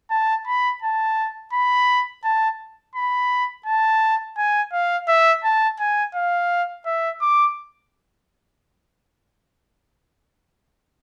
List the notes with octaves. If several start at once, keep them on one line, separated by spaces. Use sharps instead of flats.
A5
B5
A5
B5
A5
B5
A5
G#5
F5
E5
A5
G#5
F5
E5
D6